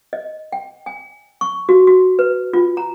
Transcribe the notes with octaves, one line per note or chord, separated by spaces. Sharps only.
D#5
G5
G#5
C#6
F#4
F#4
B4
F4
A#5